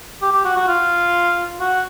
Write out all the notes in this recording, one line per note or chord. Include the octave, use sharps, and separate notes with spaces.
G4
G4
F#4
F#4
F4
F#4